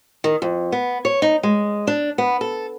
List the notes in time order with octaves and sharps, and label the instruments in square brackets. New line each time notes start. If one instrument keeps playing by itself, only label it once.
[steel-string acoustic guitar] D#3
F2
B3
C#5
D#4
G#3
D4
B3
A4